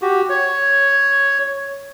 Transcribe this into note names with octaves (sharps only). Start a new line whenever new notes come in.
F#4 G4
C#5